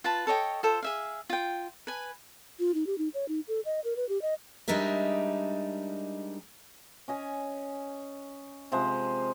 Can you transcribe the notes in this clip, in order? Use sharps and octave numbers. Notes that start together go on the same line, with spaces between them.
F4 B4 A5
A4 C#5 D#5 G5
F4 A4 C5
G#4 E5 F5
F4 G5
B4 G#5
F4
D#4
G4
D#4
C#5
D#4
A4
D#5
A#4
B4
G4
D#5
G3 G#3 D4 D#4 A#4 E5
C#4 D#5 G#5
C3 F3 G#3 C5